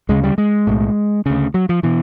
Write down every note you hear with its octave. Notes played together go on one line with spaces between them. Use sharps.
D2 C#3 G#3
G3
G#3
B1 A2
D2 C#3
F#3
F3
B2 E3